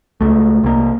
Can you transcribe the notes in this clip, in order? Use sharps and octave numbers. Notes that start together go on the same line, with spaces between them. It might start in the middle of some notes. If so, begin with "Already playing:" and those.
C#2 A3
C2 A#3